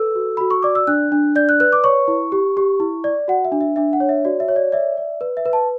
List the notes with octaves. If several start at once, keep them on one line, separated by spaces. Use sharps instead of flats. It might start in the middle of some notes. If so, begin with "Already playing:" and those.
Already playing: A4 B4 E6
F#4
F#4 B5
C#6
D5 D6
E6
D4 F#6
D4
D5 G6
F#6
B4 F#6
D6
C#5 C#6
E4
G4
G4
E4
D5
F#4 F#5
E5
D4
E5
D4 E5
F#5
C#5
E5
F#4 D5
E5
C#5
D5
D5 E5
D5
B4
E5
B4
A5